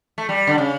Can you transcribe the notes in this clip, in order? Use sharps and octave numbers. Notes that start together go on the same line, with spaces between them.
A3
G3
D3
C#3